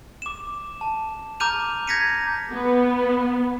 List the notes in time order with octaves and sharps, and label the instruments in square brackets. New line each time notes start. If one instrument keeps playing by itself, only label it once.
[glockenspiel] D6 E7
A5
A#5 D6 F6 G6 D#7 F7
G6 G#6 A#6 B6 C#7 D#7
[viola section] B3